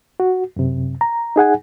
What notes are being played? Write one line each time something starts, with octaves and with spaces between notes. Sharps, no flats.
F#4
F#2 C3
A#5
D#4 G#4 F#5 G#5